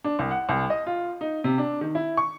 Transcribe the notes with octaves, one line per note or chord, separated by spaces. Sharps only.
D4
C2
F#5
C2
D#5
F4
D#4
C3
D4
D#3
E4
C#6